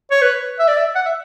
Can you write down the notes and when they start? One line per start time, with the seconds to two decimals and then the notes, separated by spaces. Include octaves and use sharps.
0.11 C#5
0.22 B4
0.59 E5
0.68 D5
0.77 E5
0.95 F#5
1.06 E5